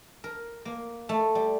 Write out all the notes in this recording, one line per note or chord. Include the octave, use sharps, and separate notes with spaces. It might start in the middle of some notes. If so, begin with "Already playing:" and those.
A#4
A#3
A3
G3